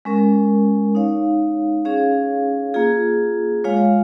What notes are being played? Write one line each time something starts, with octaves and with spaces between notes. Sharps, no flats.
G#3 C#4 A#4
D#4 C#5 F5
C#4 G#4 C#5 F5
A#3 F4 G#4
G#3 F4 C#5 F5